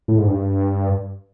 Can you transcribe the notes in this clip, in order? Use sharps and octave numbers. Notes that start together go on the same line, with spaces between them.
A2
G#2
G2